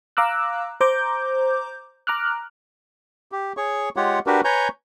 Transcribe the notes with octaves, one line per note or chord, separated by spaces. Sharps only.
F5 A#5 D6 E6 F#6
C5 A#5 D6 G6
A#5 D6 F6 F#6
G4
G#4 C#5 C#6
G#3 F4 G4 C#5 F#5
D4 F#4 G4 A#4 B4
B4 C#5 G#5 A#5 C#6 G6